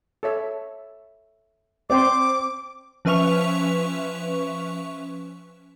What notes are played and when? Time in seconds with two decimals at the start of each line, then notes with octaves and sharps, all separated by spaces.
0.23 A4 C#5 E5
1.90 C4 D5 G5 C6 D6
3.05 F3 C#4 B4 E5 C#6 F7